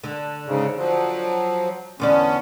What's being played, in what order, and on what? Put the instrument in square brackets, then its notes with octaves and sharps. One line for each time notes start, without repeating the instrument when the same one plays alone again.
[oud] D3
[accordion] G#2 C#3
F3 F#3
[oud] E2 D3 D5 [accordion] B3 C#4